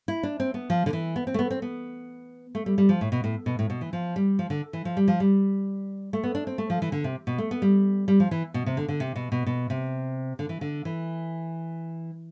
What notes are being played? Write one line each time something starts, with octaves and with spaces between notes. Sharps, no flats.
E4
D4
C4
B3
F3
D3
E3
B3
C4
A3
B3
C4
B3
A3
G3
G3
F3
A2
B2
A2
B2
A2
B2
E3
F3
G3
F3
D3
E3
F3
G3
F3
G3
A3
B3
D4
C4
A3
F3
E3
D3
C3
B2
A3
B3
G3
G3
F3
E3
B2
C3
D3
D3
C3
B2
B2
B2
C3
D3
E3
D3
E3